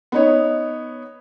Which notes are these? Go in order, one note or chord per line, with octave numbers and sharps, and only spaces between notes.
B3 D#4 C#5